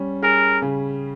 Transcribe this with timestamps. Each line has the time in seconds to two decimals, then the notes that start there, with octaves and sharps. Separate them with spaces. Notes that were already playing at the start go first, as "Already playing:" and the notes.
Already playing: G3 C#4
0.22 G#4 A#4
0.62 C#3